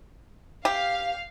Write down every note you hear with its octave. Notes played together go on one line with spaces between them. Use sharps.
G4 F5